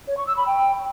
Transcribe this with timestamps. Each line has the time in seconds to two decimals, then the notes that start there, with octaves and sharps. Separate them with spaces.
0.08 C#5
0.17 C#6
0.27 E6
0.37 B5
0.46 G5